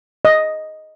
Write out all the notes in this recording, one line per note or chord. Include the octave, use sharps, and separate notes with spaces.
D#5